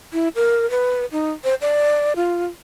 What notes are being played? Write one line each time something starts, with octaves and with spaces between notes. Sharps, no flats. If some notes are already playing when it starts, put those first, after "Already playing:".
E4
A#4
B4
D#4
C5
D5
F4